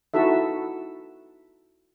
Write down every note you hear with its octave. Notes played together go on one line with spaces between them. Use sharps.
D#4 E4 F#4 A4 E5